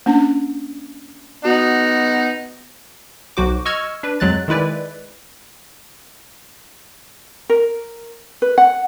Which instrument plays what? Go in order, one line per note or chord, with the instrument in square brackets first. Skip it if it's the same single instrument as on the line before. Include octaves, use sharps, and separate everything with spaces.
[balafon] A#3 C#4 D4
[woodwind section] B3 [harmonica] D#4 F#5 [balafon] F#4
[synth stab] B1 F#3 F#4 C5 D6
D#5 C#6 E6 F6 G#6
D4 B4
F2 F#3 G#3 F#6 A6
D#3 G#3 E4 B4 D5
[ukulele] A#4
B4
F#5